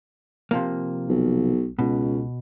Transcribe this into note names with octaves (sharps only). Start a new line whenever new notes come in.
C3 F3 A#3
B1
C#2 B2